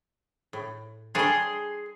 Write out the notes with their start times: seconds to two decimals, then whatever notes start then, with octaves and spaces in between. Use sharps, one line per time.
0.53 A2
1.15 G3 D4 G#4 C#5 C6